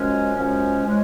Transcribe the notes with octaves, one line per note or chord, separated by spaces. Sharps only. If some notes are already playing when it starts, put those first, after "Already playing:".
Already playing: F#2 F3 G#3 C#4
F#2 F3 G#3 C#4
F3 G#3 C#4